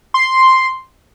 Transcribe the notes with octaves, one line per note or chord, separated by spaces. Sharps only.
C6